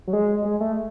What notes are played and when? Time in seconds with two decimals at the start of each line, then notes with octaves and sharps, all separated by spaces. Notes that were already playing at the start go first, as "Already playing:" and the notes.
0.07 F#3
0.13 G#3
0.45 G#3
0.60 A3